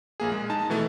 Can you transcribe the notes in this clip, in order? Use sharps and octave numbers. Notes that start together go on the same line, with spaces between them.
A#1 A#3 G#4
G#3
D#4 A5
B2 E3 A3